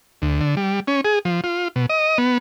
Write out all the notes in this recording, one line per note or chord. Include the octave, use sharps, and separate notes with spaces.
D2
D3
G3
C#4
G#4
F3
F4
B2
D#5
B3